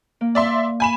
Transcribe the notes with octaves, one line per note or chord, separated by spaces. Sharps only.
A#3
D5 E5 C6
G#5 B5 E7